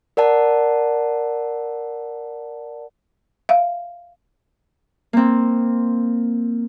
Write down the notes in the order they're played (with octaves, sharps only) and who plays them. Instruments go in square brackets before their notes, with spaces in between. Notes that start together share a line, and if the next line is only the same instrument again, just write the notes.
[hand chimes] A#4 D5 F#5 A5
[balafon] E5 F5
[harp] A#3 C4